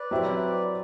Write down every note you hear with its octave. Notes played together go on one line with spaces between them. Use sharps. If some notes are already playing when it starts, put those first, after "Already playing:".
Already playing: B4 D5
F#3 C4 E4 G4